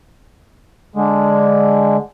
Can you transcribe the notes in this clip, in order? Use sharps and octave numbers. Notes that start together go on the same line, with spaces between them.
D3 G#3